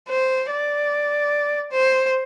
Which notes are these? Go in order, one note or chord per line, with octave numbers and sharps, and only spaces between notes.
C5
D5
C5